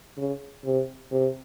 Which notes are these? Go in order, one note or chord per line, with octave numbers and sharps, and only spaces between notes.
C#3
C3
C3